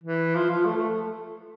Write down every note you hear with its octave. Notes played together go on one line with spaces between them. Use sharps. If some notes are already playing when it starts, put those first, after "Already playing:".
E3
F3
F3
A3
A3